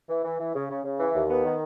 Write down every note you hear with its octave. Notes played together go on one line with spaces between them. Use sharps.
E3
E3
E3
C#3
C#3
C#3
E3
D#2
B3
D#3